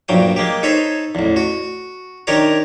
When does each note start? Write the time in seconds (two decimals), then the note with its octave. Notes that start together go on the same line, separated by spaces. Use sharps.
0.09 A#1 G2 F#3 G5
0.36 G#3 A#3 G4
0.63 D#4 A4 C5 C#5 B5
1.15 A1 E2
1.36 F#4
2.27 D#3 D4 G4 A#4 C#5 A#5